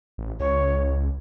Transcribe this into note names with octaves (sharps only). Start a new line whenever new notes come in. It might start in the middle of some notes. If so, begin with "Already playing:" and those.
A1
C#2 C#5